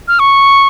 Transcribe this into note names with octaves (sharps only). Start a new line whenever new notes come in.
F6
C#6